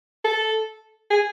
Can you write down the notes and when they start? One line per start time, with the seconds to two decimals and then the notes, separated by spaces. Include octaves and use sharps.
0.25 A4
1.11 G#4